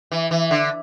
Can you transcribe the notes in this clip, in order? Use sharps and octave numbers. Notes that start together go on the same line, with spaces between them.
E3
E3
D3